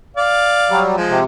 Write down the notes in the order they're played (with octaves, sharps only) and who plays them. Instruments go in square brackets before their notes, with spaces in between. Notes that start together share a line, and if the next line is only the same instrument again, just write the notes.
[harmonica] D5 F5
[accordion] F#3 G3
[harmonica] F3 G#3
[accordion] C3